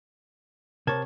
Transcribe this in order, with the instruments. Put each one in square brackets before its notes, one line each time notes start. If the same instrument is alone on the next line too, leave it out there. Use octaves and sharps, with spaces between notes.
[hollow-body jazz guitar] C3 C#5 [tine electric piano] A#4 A5 G#6